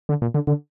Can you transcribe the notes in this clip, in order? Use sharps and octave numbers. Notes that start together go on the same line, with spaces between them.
D3
A#2
D3
D3